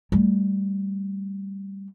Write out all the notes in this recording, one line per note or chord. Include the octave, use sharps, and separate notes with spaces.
G3 A3